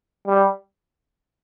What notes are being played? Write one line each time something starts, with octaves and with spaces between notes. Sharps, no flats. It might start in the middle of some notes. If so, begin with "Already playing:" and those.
G3